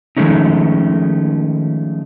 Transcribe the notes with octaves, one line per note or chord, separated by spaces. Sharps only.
D#3 F3 G#3 A3 C#4 D#4